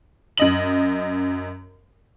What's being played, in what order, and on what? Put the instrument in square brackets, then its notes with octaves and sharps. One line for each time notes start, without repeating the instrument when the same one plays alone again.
[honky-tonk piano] F#2 D#5 F#7